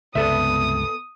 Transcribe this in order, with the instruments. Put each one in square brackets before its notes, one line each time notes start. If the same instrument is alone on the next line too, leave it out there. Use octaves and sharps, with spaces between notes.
[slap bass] C#2 G2 C3 [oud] B3 A4 E5 [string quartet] D#6